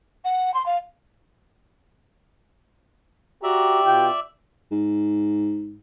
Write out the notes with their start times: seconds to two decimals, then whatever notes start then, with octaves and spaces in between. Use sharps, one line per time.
0.25 F#5
0.54 C6
0.66 F5
3.43 F#4 G4 D5 E5 A#5
3.85 B2 F4 G5
4.72 G#2